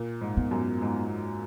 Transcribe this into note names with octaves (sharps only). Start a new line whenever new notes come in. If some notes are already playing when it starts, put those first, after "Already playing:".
Already playing: A#2
G#2
B3
F#2
G#2